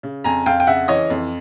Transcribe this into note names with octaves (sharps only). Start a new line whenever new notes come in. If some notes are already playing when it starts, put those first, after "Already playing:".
C#3
F2 G#5 A#5
F2 F5 G5
G5
C#3 E5 F#5
E3 C#5 D#5
F2